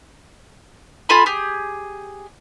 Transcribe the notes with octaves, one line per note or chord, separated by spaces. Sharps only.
F4 A4 G#5 B5
G4 G#4